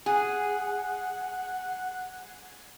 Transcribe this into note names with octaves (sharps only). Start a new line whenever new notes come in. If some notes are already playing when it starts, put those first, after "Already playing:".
G#4 F#5